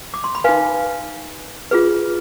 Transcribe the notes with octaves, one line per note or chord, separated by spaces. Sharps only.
D6
C6
B5
D#4 B4 F5 G#5
F4 G#4 B4